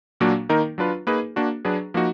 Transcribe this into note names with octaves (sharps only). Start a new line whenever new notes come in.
A#2 F#3 A#3 D4 F#4
D#3 A#3 D#4 A#4
F#3 D4 F4 B4
A#3 D#4 G#4 B4
A#3 D4 F#4
F#3 D4 G#4 B4
F3 A#3 D#4 F#4